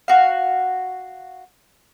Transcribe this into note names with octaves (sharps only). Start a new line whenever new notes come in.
F#4 F5